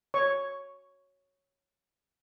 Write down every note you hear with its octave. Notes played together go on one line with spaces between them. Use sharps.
C#5 C#6